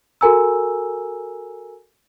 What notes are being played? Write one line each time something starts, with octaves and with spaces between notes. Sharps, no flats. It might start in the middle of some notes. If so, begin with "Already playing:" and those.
F#4 A4 A#4 G#5 A#5 E6